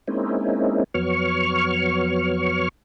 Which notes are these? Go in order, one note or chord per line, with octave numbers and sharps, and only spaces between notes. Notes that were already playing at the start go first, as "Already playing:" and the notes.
G#3 A#3 C4 C#4 D#4 E4
F2 F#3 B3 C#5 C#6 F6